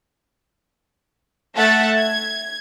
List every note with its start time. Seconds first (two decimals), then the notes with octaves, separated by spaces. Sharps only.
1.56 A3 A4 E5 F#5 A5 A6
1.98 G#6